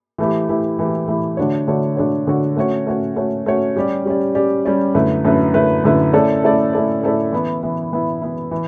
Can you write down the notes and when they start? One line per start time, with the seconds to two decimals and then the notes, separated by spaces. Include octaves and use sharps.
0.18 E3 A3 E4 G4
0.49 E3 A3 E4 G4
0.79 E3 A3 E4 G4
1.08 E3 A3 E4 G4
1.37 D3 A3 D4 F#4 C#5
1.68 D3 A3 D4 F#4 C#5
1.97 D3 A3 D4 F#4 C#5
2.27 D3 A3 D4 F#4 C#5
2.57 A3 C#4 F#4 C#5
2.87 A3 C#4 F#4 C#5
3.16 A3 C#4 F#4 C#5
3.46 A3 C#4 F#4 C#5
3.76 G3 C#4 G4 D5
4.05 G3 C#4 G4 D5
4.35 G3 C#4 G4 D5
4.65 G3 C#4 G4 D5
4.94 F#2 D3 A3 E4 B4
5.25 F#2 D3 A3 E4 B4
5.54 F#2 D3 A3 E4 B4
5.84 F#2 D3 A3 E4 B4
6.13 A3 C#4 E4 A4 D5
6.43 A3 C#4 E4 A4 D5
6.73 A3 C#4 E4 A4 D5
7.03 A3 C#4 E4 A4 D5
7.32 E3 B3 E4
7.63 E3 B3 E4
7.92 E3 B3 E4
8.22 E3 B3 E4
8.51 E3